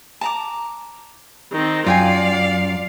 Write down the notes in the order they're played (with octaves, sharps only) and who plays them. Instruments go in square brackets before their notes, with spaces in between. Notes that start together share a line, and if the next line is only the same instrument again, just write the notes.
[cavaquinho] A5 A#5 D6
[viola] D#3 C4
[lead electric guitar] F#2 [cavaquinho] F4 G5 G#5 [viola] D5 F5